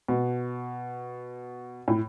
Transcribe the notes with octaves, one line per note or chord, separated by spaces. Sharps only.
B2
A2